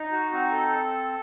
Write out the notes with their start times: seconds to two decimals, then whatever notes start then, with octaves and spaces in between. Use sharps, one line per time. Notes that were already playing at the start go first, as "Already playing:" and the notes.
Already playing: D#4
0.12 F#4
0.32 C4 F#4
0.52 A4